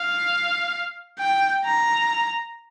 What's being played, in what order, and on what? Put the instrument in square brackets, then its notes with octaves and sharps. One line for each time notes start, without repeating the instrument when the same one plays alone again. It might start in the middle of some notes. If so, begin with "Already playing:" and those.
Already playing: [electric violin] F5
G5
A#5